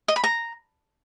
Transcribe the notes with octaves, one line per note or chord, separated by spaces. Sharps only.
D#5
B5
A#5